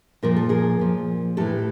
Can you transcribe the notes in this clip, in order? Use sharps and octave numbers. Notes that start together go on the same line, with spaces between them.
A#2 F3 A#4
A4
G#4 A#4
A#2 F3
A2 E3 G4 A4